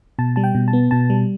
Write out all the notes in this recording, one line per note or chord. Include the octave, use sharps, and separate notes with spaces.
B2 A5
G3 A5
G5
B2
A5
B3
B2 A5
G3